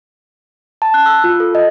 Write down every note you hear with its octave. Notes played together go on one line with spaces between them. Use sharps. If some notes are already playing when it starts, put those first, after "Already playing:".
A5
F#6
E6
F4
A4
D#5